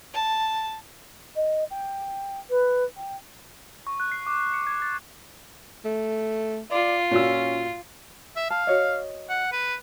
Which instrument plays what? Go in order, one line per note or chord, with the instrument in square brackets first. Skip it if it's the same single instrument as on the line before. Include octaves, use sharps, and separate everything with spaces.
[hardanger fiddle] A5
[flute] D#5
G5
B4
G5
[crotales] C#6
F#6
C7
D6
C7
C#7
G#6
A6
[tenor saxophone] A3
[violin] F4 [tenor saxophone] D5
[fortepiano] A#2 F#4 E6 [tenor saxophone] C#4
[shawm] E5
[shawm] F5 [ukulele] A5
[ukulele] F#4 C#5 D#5
[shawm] F#5
B4